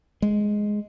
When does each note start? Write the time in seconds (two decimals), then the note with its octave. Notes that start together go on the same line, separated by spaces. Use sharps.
0.22 G#3